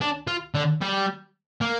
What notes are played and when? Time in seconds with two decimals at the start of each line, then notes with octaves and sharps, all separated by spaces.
0.01 D4
0.28 F4
0.55 D3
0.81 G3
1.61 A#3